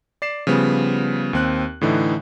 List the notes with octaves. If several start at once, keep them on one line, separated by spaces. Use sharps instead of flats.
D5 C7 E7
C#3 F3 G3 B3
D#2 C4 F#6
A2 D3 E3 D#4